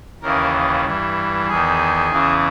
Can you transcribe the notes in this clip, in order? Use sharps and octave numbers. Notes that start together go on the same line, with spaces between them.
D#2 C#3 E3 A#4
G2 E3
E2 D#3 G#4
E2 C#3 E3